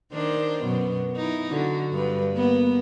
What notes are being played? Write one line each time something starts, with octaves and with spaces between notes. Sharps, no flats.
D#3 D4 C5
F#2 B2 B3
D#4 E4
D3 F#4
G2 B4
A#3 B3